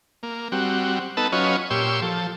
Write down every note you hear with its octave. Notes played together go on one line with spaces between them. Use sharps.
A#3
G3 C4 F#4
B3 D#4 A4 B4 A5 E6
F#3 C#4 F4 B4 C#5 D#5
A#2 G4 C#5 C6 E6
F3 A4